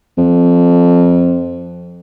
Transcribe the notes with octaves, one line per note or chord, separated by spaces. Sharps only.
F2